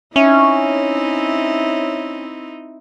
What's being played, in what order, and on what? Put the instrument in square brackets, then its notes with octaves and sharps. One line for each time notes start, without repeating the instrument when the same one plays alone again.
[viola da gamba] C4 D#4 E4 [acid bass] C#4 [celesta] E5